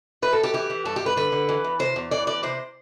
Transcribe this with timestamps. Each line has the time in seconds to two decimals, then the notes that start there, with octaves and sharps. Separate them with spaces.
0.22 F#2 B4
0.33 A4
0.38 F#2
0.43 G4
0.54 E3 G4
0.70 E3
0.85 G2 A4
0.96 G4
1.01 G2
1.06 B4
1.16 D3 B4
1.32 D3
1.49 E3
1.64 E2
1.79 C3 C5
1.96 E2
2.11 E3 D5
2.27 E2 D5
2.43 C3 C5